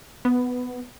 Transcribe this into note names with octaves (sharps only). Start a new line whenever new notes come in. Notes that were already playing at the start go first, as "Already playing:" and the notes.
B3